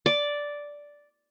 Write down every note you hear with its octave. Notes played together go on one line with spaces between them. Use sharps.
D5